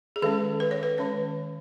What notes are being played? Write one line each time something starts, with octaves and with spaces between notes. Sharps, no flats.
G#4
D#3 G#3 C#4 A4
B4
C#5
B4
D#3 G#3 C#4 C#5